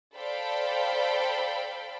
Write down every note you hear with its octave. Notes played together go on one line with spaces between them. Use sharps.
A4 C5 D5 F5 G5 B5